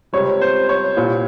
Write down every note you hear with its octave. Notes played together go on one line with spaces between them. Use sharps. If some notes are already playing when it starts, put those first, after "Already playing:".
C#2 C3 G3 C#5
C5
C#5
C2 A#2 G3